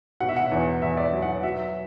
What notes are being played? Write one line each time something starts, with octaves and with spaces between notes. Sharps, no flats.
B2 F#5
E5
F#5
E2
E2 E5
D5
E5
F#3
F#5
F#3 E5